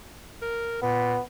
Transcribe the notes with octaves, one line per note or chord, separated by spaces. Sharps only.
A#4
A#2 B3